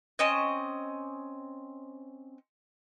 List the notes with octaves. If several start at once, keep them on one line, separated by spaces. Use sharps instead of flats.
C4 C#4 D#5